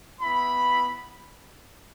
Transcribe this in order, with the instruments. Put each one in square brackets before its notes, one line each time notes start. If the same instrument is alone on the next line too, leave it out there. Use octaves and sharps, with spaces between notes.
[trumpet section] B3 E4 B5